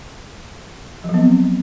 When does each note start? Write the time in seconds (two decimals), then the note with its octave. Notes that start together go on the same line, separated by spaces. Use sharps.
1.04 F3
1.09 F#3
1.14 B3
1.19 C4